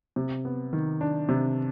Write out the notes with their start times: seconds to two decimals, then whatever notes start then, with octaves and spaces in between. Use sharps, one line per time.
0.16 C3
0.45 B3
0.73 D#3
1.01 D4
1.29 C3